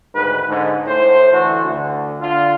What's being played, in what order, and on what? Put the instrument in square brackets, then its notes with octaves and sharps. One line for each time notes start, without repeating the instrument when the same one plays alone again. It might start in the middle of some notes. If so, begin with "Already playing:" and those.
[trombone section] D2 G#2 D#3 B4
G#2 D3
A2 C5
D2 E3 A3 F#4
D2 D3
D3 F4